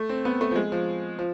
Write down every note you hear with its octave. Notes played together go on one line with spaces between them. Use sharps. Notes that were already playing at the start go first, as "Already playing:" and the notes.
Already playing: A3
C4
B3
A3
F3
G#3
F3
F3